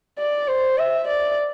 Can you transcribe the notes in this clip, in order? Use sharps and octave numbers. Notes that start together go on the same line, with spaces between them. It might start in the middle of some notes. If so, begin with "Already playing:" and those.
D5
C5
E5
D5